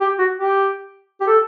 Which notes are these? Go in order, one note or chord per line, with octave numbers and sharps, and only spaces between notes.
G4
F#4
G4
G4
A4